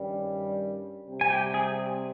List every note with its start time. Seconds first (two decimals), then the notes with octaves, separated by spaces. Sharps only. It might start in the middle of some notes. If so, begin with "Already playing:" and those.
Already playing: G2 D#3 G3 C#4
1.06 C3 G3 C4
1.21 G#5
1.30 G4 G5
1.54 G#4 G#5